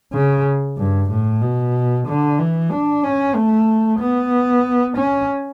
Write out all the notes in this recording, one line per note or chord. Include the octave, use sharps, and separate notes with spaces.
C#3
G2
A2
B2
D3
E3
D4
C#4
A3
B3
C#4